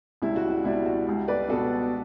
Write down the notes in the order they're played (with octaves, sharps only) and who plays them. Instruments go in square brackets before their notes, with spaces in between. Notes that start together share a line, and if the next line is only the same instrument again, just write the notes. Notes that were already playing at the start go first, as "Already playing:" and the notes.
[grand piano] C#2 C#3 G3 D4 [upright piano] E4
[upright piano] F#4
F#4
[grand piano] C#2 B2 G3 D4 [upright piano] E4
[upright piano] F#4
[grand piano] C#2 C#3 G3
[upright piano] B4 D5
[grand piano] C#2 B2 G3 B3 D4 [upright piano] F#4 A4